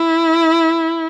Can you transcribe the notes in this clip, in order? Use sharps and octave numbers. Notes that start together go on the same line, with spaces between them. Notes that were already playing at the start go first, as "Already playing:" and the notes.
Already playing: E4